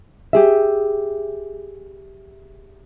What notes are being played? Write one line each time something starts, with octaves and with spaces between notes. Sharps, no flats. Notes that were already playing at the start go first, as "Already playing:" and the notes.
G4 G#4 E5